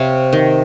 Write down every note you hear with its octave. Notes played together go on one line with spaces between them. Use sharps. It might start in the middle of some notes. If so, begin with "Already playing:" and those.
Already playing: C3 C#5 F5
D#3